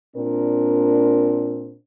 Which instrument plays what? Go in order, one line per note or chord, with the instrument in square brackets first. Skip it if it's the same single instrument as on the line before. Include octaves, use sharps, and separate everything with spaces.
[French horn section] A#2 C4 D4 A#4